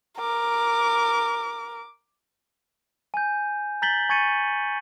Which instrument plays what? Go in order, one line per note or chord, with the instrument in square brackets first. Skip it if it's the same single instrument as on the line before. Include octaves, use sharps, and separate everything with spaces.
[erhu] A#4 [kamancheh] D6
[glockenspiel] G#5 G6
A#5 G6 A6 B6 F#7 G7
G#5 C#6 G#6 A6 C#7 D#7